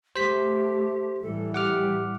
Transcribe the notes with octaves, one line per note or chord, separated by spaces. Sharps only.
A3 G4 C5 B6
A2 E3 G3 A4
G4 F#5 D6 F6